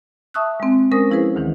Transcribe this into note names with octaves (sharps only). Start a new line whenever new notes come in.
E5 A5 C#6 D#6 E6 F#6
G#3 C4
G#3 C#4 A#4 C5 D#6 A#6
F3 E4 G#4 B4 C5
D2 D#3 E3